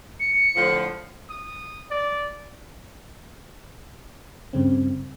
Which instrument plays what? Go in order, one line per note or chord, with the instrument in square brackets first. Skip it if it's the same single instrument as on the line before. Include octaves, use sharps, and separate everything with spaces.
[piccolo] C#7
[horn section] A2 D3 F3
[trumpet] D#6
D5
[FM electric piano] G2 C#3 C4